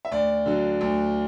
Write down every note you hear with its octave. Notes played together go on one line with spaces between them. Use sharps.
E5
D2 D5
D3 F#3
D2